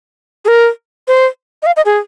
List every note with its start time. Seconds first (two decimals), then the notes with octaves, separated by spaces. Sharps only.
0.45 G#4
0.48 A#4
1.08 C5
1.63 D#5
1.66 F5
1.77 D#5
1.86 G#4